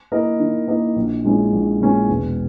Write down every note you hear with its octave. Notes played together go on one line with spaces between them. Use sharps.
A#3 E4 A#4 D#5
D#3
A#3 E4 A#4 D#5
A#1
A#2 G#3 C#4 E4
A#1
A#2 G#3 C#4 E4
E1